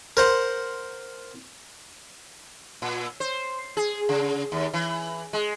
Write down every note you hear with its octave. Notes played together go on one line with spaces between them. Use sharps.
A#4 C5 F#5
A#2
C5
G#4
C#3
D#2
E3
G#3